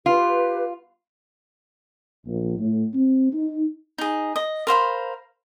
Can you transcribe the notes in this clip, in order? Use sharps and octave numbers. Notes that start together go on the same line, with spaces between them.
F4 G4 B4
A#1
A2
C4
D#4
D#4 G#4
D#5
A#4 C5 F5 B5